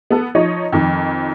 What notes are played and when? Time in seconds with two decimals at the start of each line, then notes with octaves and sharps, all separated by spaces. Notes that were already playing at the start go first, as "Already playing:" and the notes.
0.10 B3 A4
0.35 F3 D#4 C#5 D#5
0.72 F2 D#3 F3